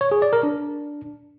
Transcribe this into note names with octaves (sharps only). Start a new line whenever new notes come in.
C#5
G#4
D5
A#4
D4